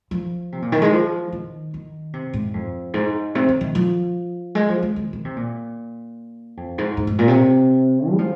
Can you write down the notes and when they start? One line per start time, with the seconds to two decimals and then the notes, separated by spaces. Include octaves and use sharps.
0.11 F3
0.52 C3
0.62 A#2
0.72 D#3
0.82 G#3
0.92 F3
1.32 D#3
1.74 D#3
2.13 C3
2.33 G#2
2.54 F2
2.94 G#2
3.35 C3
3.49 D#3
3.61 D#3
3.75 F3
4.55 G#3
4.69 F3
4.83 G#3
4.96 D#3
5.13 D#3
5.25 C3
5.37 A#2
6.57 F2
6.78 G#2
6.97 G#2
7.07 G#2
7.19 A#2
7.28 C3
8.12 G#3
8.19 F3